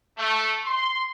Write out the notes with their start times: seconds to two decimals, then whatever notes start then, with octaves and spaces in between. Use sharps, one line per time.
0.18 A3
0.64 C6